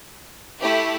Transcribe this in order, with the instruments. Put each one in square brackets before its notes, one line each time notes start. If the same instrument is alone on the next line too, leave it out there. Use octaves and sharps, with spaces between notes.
[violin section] A3 E4 G4